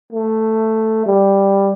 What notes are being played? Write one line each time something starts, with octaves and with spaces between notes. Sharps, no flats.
A3
G3